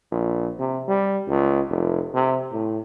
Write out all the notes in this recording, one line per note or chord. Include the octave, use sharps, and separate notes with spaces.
A#1
C3
G3
C#2
F1
C3
A2